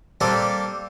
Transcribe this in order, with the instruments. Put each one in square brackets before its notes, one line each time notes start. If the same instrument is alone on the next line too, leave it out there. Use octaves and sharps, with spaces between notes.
[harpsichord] G3 A#3 C4 D4 G4 A4